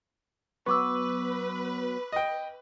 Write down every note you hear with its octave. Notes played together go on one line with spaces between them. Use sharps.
F#3 B3 B4 C#6 D6 E6
D#5 G5